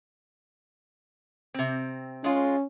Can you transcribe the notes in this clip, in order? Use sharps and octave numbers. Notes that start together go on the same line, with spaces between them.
C3 C4
G#3 C#4 F4